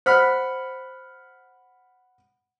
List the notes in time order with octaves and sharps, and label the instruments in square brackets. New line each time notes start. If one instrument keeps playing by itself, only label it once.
[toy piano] C5 [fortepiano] F#5 B5 F6